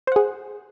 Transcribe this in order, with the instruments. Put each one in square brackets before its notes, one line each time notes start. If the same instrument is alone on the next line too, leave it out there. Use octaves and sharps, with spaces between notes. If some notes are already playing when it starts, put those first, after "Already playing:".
[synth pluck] C5
F#5
G#4